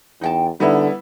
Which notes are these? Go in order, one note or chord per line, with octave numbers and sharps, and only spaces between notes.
E2 D#4 G5 A5
D3 G3 B3 D#4 E4